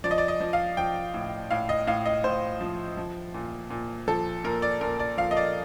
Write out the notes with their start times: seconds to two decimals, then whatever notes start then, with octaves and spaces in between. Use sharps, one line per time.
0.04 F3 D5
0.11 D#5
0.18 D5
0.28 D#5
0.40 F3
0.53 F5
0.77 F3 G5
1.14 A2
1.51 A2 F5
1.69 D#5
1.87 A2 F5
2.06 D#5
2.24 A2 C5
2.61 F3
2.97 F3
3.34 A#2
3.70 A#2
4.08 F3 A4
4.44 A#2 A#4
4.62 D5
4.81 A#2 A#4
4.99 D5
5.17 F3 F5
5.31 D#5
5.37 D5